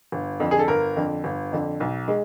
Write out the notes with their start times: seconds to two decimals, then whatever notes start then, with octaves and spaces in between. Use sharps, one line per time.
0.12 G1
0.40 F2 D3
0.51 G#4
0.59 A4
0.68 G1 A#4
0.96 F2 D3
1.24 G1
1.52 F2 D3
1.80 B1
2.08 G#3